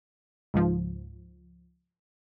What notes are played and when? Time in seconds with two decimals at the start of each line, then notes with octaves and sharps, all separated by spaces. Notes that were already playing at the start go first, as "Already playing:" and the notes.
0.54 C#2 G#2 F3